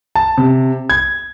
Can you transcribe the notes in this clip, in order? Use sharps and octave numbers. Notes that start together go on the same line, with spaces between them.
A5
C3
G#6